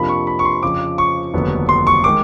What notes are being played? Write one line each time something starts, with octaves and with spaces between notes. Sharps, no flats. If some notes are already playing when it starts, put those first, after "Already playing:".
Already playing: F2 C3 F3 A#3 D4 B5
C#6
B5
C#6
C6
F2 C#3 F3 D6
C#6
F1 D#2 D3 F#3 B3
C6
C#6
D#3 G#3 D6